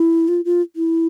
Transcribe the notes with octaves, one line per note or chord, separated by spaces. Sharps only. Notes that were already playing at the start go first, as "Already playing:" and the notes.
Already playing: E4
F4
F4
E4